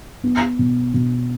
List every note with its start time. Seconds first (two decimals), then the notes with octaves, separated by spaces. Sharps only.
0.24 B3
0.59 B2
0.94 B2